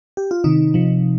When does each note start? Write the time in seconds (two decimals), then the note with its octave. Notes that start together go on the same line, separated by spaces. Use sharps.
0.17 G4
0.31 F4
0.44 C3 D#3 D#4
0.74 C3 F3